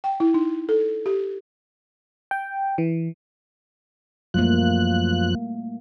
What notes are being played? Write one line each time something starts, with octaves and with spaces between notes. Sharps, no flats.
G5
E4
D#4
A4
G4
G5
E3
F#2 F3 G3 A3 A#3 F#6